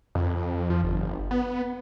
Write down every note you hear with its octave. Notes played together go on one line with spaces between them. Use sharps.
F2
F3
G1
B3